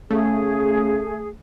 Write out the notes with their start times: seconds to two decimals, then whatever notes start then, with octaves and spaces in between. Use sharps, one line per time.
0.10 C#3 A3 G#4